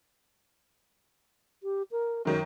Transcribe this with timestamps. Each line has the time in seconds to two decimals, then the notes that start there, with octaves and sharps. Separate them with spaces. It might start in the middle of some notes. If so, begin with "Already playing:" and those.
1.63 G4
1.91 A#4
2.25 F#2 D#3 F#3 A#4